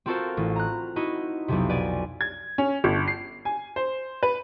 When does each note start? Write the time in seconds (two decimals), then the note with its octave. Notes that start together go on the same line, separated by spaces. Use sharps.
0.06 C4 F4 F#4 A4 A#4 C5
0.37 A1
0.56 A#5 F#6
0.96 D#4 E4 F#4
1.48 B1 F2 C3
1.69 B4 D5 G#5
2.21 G#6
2.58 C#4
2.84 G1
3.08 C7
3.45 G#5
3.76 C5
4.23 B4